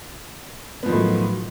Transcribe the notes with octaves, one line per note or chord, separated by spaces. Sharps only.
A2 D#3 F3 F#3 B3